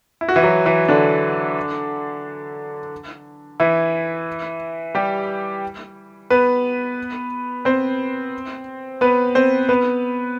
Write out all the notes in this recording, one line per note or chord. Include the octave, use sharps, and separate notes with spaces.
E4
F#4
E3 E4
F#3 F#4
E3 E4
D3 D4
E3 E4
G3 G4
B3 B4
C4 C5
B3 B4
C4 C5
B3 B4